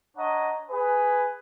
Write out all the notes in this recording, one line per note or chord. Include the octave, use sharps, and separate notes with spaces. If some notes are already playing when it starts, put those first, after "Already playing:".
D4 C#5 D#5 F#5 A#5
G#4 B4